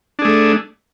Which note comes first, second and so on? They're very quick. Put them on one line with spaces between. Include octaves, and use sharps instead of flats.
D4 G#4 A3